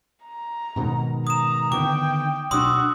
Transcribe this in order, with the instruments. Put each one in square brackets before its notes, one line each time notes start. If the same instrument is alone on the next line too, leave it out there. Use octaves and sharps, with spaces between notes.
[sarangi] A#5
[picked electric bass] G#2 B2 D#3
[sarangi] A#5 [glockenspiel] D#6 E7
[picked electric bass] D3 D#3 B3 [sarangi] G5 [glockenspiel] D6
[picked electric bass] B1 D4 [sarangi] F#4 [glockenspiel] C6 D#6 E6